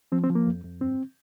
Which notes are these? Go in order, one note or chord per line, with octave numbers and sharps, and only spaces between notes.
F3 C4
C4
F3
A#3
F2
F2
G2 C4